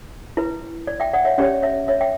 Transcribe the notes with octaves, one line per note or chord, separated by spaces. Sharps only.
E4 B4
D5
E5 G5
D5 F#5
C#5 E5
C#4 G4 C#5 D5
C#5 E5
C#5 E5
E5 G5